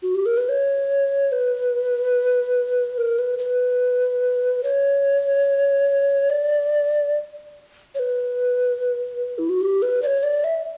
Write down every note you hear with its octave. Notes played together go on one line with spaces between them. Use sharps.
F#4
G4
A#4
B4
C#5
B4
A#4
B4
B4
C#5
D5
C#5
B4
E4
F#4
G4
B4
D5
C#5
D5
E5